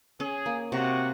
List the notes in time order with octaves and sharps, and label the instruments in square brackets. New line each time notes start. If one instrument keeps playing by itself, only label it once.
[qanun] C#4 [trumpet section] G#4
[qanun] A#3
[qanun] C3 [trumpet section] F#4